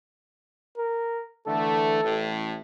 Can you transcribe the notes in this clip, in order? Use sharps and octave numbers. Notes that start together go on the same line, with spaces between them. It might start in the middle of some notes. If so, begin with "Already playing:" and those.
A#4
D3 E3 A3 A4
A1 A2